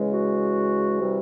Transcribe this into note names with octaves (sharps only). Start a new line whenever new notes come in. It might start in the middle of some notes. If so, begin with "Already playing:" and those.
Already playing: C#3 E3 G#3
F#4
C3 E3 G3